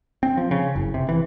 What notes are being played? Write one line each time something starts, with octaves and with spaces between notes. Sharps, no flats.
C4
F3
C#3
F#1
C3
E3